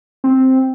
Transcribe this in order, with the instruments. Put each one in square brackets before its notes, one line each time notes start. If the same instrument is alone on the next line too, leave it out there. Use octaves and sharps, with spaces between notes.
[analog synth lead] C4